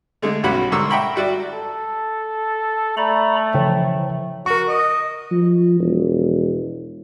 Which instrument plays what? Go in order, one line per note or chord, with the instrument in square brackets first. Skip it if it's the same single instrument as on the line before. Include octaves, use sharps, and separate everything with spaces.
[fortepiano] D3 G#3 A3
B1 G3 C#4 F#4 F#5 B5
G#2 D3 G3 A#4 C#6 E6
E5 F#5 G5 A#5 B5 C#6
G3 F#4 D5 E5
[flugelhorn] A4
[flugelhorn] A3 [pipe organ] D5 A#5 B5
[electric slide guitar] C#3 E3 A4 [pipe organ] F3 [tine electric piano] C#5 E5 G5
[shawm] F#4 [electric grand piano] A#4 C#6
[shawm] D#5
[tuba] F3
E1